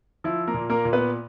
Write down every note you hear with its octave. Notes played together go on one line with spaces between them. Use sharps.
F3 E4
A#3 A#4
A#2
A#3 A#4
A#2
B3 B4